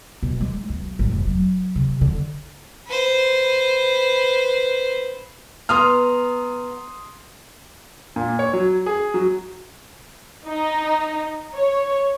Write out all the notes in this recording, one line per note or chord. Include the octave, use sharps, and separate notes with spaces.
B2
G#3
B1
G#1
F1
F#3
C3
D3
B4 C5
B3 A#5 C6 D#6 F6
A#2
C#5
F#3
G#4
F#3
D#4
C#5